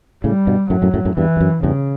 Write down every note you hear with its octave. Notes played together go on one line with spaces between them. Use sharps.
A2 C#3 G3
G2 B2
F#2 A2 F#3
F#2 A2
F#2 A2
F#2 A2
E2 G2 E3
G2
F#2
E2 G2 C#3